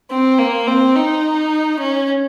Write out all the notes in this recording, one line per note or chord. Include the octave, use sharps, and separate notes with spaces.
C4
A#3
C4
D#4
C#4